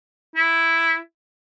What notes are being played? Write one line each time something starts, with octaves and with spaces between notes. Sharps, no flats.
E4